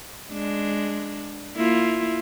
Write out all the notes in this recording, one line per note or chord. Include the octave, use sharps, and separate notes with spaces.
G#3 D4
A#3 E4 F4